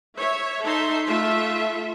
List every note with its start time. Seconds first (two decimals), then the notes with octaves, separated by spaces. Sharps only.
0.17 C#5 E5
0.63 D#4 A4 E5 C6
1.05 A3 F4 A4 E5